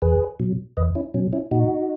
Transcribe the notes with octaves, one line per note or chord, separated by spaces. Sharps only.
E2 G#4 B4
B2 F#3
E2 B4 D#5
C#4 E4
B2 F#3 C#4
C#4 E4
A#2 D#4 F#4